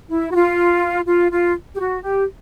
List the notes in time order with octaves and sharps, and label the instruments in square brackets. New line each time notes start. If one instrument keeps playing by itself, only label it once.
[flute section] E4
F#4
F4
F4
F4
G4
F#4
G4